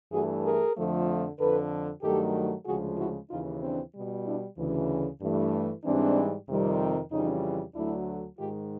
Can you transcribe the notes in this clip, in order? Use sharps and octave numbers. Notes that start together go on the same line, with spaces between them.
G2 E3 A3 F#4 G#4
G#4 A#4
F2 D3 F3 A3
F2 D3 F3 A4 B4
G2 D#3 F#3 A3 G4 A4
D2 C#3 F3 G#3 F#4 G#4
E4 F#4
D#2 C#3 E3 D#4 F4
C4 D4
B2 G3
D4 E4
D2 C#3 E3
G2 E3 A3
G#2 E3 G3 C4 D4
F2 C3 D#3 G3
F2 C#3 E3 G3 C#4 D#4
D2 D3 F#3 A3 D4 E4
G#2 D#3 G#3 F4 G4